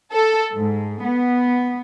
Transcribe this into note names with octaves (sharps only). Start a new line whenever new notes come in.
A4
G#2
B3